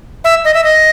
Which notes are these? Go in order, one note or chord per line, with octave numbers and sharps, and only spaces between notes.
E5
D#5
E5
D#5